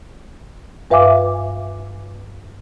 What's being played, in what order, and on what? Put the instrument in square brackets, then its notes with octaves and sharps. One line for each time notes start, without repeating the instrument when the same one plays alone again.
[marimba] G2 B4 E5 F5 G#5 D6